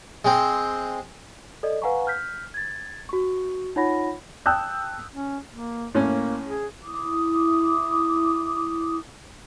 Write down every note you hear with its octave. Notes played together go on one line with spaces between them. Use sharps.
G#3 C4
A4 D5 D#5
B4 F5 F#5 G#5 A#5 C#6
F6 G6 B6
G#6 A6
F#4 C#6
D#4 F4 C#5 F#5 B5 A#6
G5 A5 D#6 E6 F#6 G6
C#4
A#3
A2 A#3 C#4
G#4
E4 D6 D#6